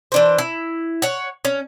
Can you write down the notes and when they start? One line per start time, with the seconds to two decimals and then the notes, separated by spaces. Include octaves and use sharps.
0.12 E3 D4 C5
0.38 E4
1.02 C#5 F#5
1.45 C#4